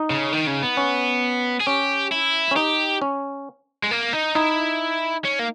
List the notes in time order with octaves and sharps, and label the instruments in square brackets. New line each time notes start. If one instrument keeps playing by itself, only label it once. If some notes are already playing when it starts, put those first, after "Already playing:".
Already playing: [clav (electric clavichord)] D#4
[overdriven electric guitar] C#3
D#3
C#3
B3
[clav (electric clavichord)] C#4
[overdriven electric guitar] G#4
[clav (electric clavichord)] C#4 [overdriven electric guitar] G4
[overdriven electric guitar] E4
[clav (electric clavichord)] C#4
[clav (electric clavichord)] D#4 [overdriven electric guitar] G4
[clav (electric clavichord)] C#4
[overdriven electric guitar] G#3
A#3
D#4
[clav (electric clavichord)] D#4 [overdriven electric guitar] E4
[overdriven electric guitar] C#4
A#3